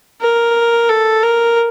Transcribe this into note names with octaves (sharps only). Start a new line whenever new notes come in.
A#4
A4
A#4